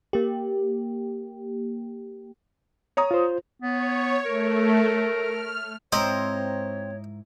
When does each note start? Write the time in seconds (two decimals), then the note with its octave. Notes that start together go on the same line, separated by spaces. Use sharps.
0.13 A#3 G4
2.97 C#5 A#5 D#6
3.11 F4 C5
3.62 B3 C#5
4.26 A3 A#4
5.12 F6
5.92 G#2 C4 E4 A#4 C#5 D#5 A#5